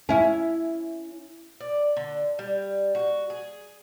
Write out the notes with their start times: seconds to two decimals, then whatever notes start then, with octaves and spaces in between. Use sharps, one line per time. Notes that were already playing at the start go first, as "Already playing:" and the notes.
0.09 C#4 E4
1.60 D5
1.97 D3
2.39 G3
2.95 F#4
3.30 G#4